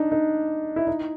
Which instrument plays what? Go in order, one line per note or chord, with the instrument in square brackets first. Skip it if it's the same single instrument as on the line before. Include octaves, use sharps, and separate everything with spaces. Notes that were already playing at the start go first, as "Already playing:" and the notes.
Already playing: [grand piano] D4 D#4
D#4
E4
D#4